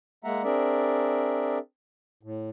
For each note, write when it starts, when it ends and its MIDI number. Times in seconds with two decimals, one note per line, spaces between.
0.24 0.43 56
0.24 0.43 58
0.24 0.43 76
0.24 0.43 78
0.24 0.43 82
0.44 1.58 60
0.44 1.58 62
0.44 1.58 68
0.44 1.58 70
0.44 1.58 74
0.44 1.58 76
2.23 2.50 45